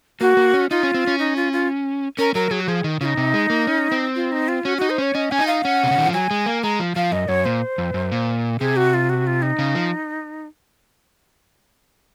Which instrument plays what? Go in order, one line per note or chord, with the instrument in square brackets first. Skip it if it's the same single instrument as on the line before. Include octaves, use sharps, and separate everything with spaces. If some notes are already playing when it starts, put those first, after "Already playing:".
[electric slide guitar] A#3 [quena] F#4
[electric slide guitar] A#3
C#4
[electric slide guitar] D#4 [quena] F4
[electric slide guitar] C#4
C4
C#4
[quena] D#4
F4
F4
[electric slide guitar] C#4 [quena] A#4
[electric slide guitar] F#3 [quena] A#4
[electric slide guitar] F#3 [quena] G#4
[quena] F#4
[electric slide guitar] F3 [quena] G#4
[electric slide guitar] D#3
[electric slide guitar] C#3 [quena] F4
[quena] D#4
[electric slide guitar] C3
G#3
A#3
C#4
C4
[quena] F4
D#4
F4
[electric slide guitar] C#4 [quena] F#4
[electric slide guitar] D#4 [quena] F#4
[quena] C5
[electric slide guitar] C#4 [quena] C#5
[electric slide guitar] C#4 [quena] D#5
[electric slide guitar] C#4 [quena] G#5
[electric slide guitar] D#4
[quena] F5
[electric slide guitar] C#4 [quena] F#5
[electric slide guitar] C3
C#3
D#3
F3
[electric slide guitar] F#3 [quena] G#5
[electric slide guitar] G#3
A#3
[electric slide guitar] G#3 [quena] A#5
[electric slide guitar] F3
[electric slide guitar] F3 [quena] F5
[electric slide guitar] F#2 [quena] D#5
[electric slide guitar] F#2 [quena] C#5
[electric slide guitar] A#2 [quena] C5
[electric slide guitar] F2
F#2
A#2
[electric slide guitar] C3 [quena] G#4
[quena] F#4
F4
F#4
F4
D#4
[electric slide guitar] C#3
F3